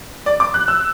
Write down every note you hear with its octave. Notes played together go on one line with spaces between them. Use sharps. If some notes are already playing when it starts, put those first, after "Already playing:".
D5
D6
F#6
E6